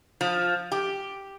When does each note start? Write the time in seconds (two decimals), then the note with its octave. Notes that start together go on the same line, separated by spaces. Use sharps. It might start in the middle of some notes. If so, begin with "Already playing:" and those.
0.21 F3
0.72 G4